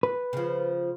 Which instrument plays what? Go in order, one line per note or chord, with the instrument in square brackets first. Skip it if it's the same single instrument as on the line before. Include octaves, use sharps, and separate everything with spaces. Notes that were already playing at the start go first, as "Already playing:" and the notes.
[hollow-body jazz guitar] B4
[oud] C#3 F3